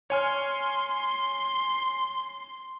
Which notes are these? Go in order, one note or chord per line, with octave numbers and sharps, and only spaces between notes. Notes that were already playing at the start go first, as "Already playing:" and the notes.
C#5 G#5 C6 F6